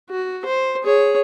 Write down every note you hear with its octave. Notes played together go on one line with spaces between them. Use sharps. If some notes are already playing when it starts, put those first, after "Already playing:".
F#4
C5
G#4 C#5